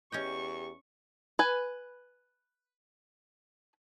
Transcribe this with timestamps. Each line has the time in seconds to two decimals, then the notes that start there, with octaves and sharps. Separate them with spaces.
0.12 E2 C#4 G4 D#5 G5 C#6
1.39 B4 G#5